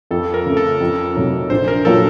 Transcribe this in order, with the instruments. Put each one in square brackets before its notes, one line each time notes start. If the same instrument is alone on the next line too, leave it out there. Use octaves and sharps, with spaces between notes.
[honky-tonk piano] F2 [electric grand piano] A4
[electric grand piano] A#4
[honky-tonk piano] C#3 A3
[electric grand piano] A4
[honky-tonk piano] F2
C3 F#3 A3 D#4
[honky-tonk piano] A#1 [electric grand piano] C5
[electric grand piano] A#4
[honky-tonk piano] A#2 F#3 A#3 F4 [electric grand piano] A4